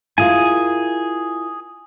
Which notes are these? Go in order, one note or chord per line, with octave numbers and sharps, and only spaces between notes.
E4 F4 G#4 A#4 G#5